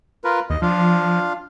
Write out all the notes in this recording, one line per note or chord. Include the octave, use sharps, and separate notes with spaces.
F4 A#4 B4
D#2 D#5
F3 D4 F4 F5